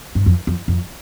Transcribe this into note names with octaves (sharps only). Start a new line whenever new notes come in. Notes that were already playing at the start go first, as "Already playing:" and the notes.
G2
F2
F2
F2